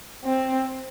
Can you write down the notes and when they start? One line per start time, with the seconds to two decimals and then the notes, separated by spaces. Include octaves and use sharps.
0.25 C4